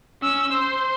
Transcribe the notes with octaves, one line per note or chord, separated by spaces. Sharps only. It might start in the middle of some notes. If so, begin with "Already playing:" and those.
C#4 E6
C5